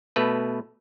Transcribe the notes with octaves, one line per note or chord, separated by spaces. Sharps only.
B2 A3 B4